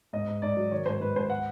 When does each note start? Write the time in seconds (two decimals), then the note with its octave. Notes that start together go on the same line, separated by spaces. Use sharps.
0.13 G#2 D#5
0.27 G#2
0.42 G#2 D5
0.57 F#3
0.71 D#3 C#5
0.86 G#2 C5
1.01 G#2 B4
1.16 G#2 C5
1.30 F#5